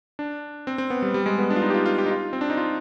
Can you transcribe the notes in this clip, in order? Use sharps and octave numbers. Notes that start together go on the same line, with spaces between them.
D4
C4
C4
B3
G3
G3
G#3
B3
D4
F4
D#4
G4
F4
F4
G4
D#4
F4
C4
D4
D#4
F4